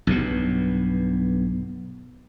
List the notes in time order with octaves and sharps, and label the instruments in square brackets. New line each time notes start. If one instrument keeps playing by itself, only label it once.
[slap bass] B1 G2 B2